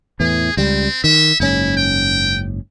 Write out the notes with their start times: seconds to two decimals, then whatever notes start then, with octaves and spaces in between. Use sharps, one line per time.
0.20 E2 A2 E3 G#4
0.57 C#2 G3 C4
1.04 D#3 E5
1.40 F#1 G#2 C#4 E4
1.77 G5